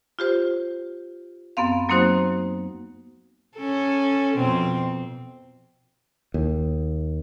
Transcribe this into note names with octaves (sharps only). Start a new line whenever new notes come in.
F4 G4 C5
F#2 B3 C4 F5
F#3 A#3 C4 D#4 F#4 C5
C#4 A4
F2 B2 C4
D#2